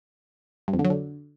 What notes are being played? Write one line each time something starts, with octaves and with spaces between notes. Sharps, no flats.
G2
F2
D3
F#3
D3